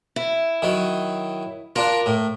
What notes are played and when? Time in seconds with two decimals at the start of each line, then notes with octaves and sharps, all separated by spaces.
0.16 E4
0.62 D#3 F#3
1.76 D4 F4 A#4
2.06 A2